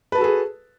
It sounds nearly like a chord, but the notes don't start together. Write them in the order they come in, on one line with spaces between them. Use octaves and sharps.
B4 A5 F#4 A4 G#4